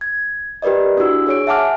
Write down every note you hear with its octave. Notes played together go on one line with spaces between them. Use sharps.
G#6
G4 A#4 B4 D5 D#5
D4 E4 F#4 E6
G#4 C#5 D7
E5 F#5 G#5 A5 D6 F6